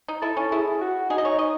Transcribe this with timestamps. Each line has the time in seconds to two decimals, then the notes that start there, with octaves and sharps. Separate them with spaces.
0.08 D#4
0.22 E4 A4
0.37 C#4
0.52 E4 G#4
0.81 F#4
1.10 D#4 G#4
1.18 D#5
1.25 C#5
1.39 D#5